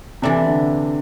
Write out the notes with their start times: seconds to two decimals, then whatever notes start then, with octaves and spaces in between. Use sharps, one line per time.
0.22 C3 E3 A3 D4
0.46 D3